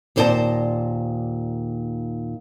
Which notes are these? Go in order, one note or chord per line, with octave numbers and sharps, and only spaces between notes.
D#2 A#2 C5 D5 D#5 A5